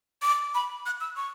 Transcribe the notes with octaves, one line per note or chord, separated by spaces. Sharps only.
D6
B5
F#6
E6
C#6